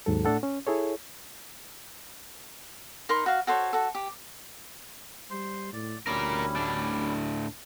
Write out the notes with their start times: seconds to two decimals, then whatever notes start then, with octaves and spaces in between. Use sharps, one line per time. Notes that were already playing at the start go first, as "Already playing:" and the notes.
0.06 D#2 G#2 F#3 A4
0.25 A2 A3 D4 A4 F#5
0.43 C#4
0.67 E4 G#4 A4 C#5
3.09 D#4 A#4 B5 C6
3.26 F#4 F5
3.47 F#4 A4 C5 C#5
3.73 F#4 A4
3.95 G4
5.30 G3 C5 C6
5.73 A2 D5
6.07 D2 G3 C#4 E4 A#4 D5
6.56 A2 D4